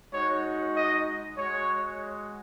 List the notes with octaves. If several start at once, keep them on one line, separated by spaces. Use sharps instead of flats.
G#3 D#4 F#4 C#5
D#5
G#3 F#4 C#5